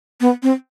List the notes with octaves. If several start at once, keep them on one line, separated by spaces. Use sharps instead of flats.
B3
C4